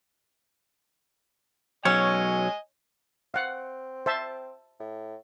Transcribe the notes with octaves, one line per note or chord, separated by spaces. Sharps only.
B1 F#3 C#4 C#5 D#5 G#5
C4 F5 F#5
C5 E5 A5
A2